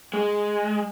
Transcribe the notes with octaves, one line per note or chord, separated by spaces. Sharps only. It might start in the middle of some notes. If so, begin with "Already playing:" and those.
G#3